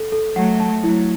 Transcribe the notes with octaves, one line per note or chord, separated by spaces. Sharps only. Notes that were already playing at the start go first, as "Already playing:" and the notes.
Already playing: A4
A4
F#3 A3 F#5
A5
F#3 A3 E4